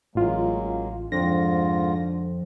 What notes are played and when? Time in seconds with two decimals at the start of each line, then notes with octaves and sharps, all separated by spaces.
0.15 A1 F#3 G#3 A#3 F4
1.12 F2 G#2 D3 F4 A#6